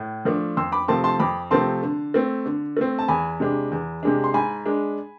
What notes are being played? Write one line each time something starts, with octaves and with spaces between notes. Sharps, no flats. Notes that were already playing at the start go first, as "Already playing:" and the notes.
Already playing: A2
F3 A3 D4
F2 C6 E6
B5 D6
C3 F3 A3 C4 A5 C6
A5 C6
F2 B5 D6
C3 F3 A3 C4 A5 C6
D3
A3 C4
D3
A3 C4
A5
E2 G#5 B5
C3 G#3 D4
E2
C3 G#3 D4
C6
G#2 G#5 B5
G#3 D4